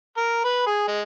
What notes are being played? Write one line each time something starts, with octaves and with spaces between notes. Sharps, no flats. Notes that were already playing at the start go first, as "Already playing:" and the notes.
A#4
B4
G#4
G#3